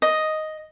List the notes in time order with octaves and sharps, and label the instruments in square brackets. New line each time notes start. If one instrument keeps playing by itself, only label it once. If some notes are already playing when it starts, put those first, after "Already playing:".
[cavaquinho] D#5